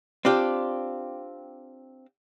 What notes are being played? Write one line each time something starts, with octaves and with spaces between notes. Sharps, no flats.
C4 D4 F4 G4